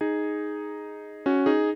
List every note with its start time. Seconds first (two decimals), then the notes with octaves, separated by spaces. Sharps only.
0.01 D#4 G#4
1.26 C#4 F#4
1.46 D#4 G#4